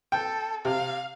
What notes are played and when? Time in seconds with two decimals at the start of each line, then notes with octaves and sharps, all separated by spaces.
0.12 A4 G5
0.65 C3 F5